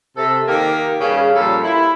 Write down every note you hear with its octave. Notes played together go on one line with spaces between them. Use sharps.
C3 A4
D#3 A#3 G4 A#4
G2 C#3
A#2 F3 G3 A#3 A4
E4